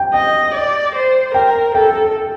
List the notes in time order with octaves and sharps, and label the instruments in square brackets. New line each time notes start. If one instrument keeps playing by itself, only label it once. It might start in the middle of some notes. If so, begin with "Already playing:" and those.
Already playing: [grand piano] G5
[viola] D#5 [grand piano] G5
[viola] D5
C5
[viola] A#4 [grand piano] G5
[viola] A4 [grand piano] G5